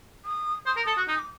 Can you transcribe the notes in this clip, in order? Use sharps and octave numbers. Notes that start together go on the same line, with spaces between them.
D#6
C5 D#6
A#4
A4 D#6
F#4
D#4 D#6
D6